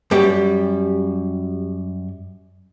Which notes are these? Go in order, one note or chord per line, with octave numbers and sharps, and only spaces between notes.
F#2 G3 G4